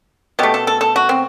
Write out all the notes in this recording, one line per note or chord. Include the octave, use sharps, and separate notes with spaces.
B2 A3 G4
A4
A4
A4
F#4
C4